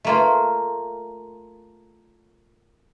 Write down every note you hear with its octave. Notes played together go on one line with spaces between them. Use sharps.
A3 A#3 F4